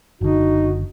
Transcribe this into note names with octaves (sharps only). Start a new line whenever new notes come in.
F#1 D3 D#4 F#4